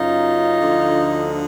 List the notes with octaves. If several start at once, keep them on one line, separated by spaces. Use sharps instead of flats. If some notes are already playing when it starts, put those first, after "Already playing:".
Already playing: F#2 C#3 F#3 D#4 F4
D2 D3 F3